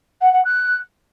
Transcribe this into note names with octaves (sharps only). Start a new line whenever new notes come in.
F#5
F#5
F#6